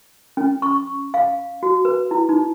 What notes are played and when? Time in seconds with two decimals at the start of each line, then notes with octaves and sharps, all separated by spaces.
0.37 C#4
0.62 C#6
1.14 F5
1.63 F#4
1.85 B4
2.11 E4
2.29 D#4